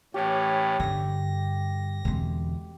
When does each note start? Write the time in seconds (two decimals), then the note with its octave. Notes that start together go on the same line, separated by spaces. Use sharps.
0.14 A2 E3 C#4 G4 G5
0.80 G2 D3 A#6
2.05 E2 B2 D3 G#3 C4